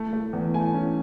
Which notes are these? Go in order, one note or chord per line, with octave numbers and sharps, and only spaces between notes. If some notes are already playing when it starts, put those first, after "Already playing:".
Already playing: A3
A3
E2
A3 G#5
C#4